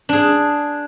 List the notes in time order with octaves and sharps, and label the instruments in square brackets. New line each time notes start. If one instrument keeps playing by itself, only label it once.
[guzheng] D4 G#4